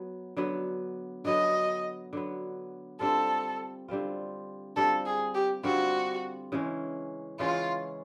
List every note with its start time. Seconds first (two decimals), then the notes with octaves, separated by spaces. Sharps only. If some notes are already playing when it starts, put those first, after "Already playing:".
Already playing: F#3 B3
0.37 D3 F#3 B3
1.25 D3 F#3 B3 D#5
2.13 D3 F#3 B3
3.00 D3 G3 C4 F4 A4
3.88 D3 G3 C4 F4
4.76 D3 G3 C4 F4 A4
5.06 G#4
5.35 G4
5.64 D3 G3 C4 F4 F#4
6.52 C#3 E3 G#3 C#4
7.40 C#3 E3 G#3 C#4 F4